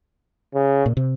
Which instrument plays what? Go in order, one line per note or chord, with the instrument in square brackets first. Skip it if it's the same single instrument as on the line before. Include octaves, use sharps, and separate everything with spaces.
[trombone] C#3
[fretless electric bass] A#2
C3